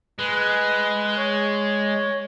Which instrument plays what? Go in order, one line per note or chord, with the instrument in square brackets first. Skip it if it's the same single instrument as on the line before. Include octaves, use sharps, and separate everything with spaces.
[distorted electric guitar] G#3 [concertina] B4
[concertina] C#5